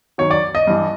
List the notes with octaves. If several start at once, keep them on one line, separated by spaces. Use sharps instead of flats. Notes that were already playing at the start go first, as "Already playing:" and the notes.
F#2 D#3 F#3 C#5
D5
D#5
G2 E3